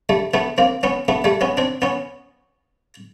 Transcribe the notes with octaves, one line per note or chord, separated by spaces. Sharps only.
G3 A3
A3 B3
A#3 C4
B3 C#4
A3 B3
G3 A3
B3 C#4
C4 D4
B3 C#4